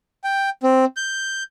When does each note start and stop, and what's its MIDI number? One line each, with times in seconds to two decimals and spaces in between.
0.24 0.50 79
0.63 0.85 60
0.97 1.43 91